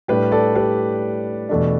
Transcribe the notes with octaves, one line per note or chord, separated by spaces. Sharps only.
A2 G3 D4 G4 B4
A4 D5
G4 B4
E2 B2 A3 D4